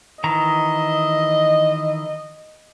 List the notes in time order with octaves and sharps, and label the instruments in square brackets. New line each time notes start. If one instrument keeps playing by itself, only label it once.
[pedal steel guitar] D#3 E3 A#5 [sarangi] D#5